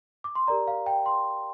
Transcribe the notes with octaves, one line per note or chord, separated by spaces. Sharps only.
D6
C6
G4 A#4 D5 A#5
F5
G5
C6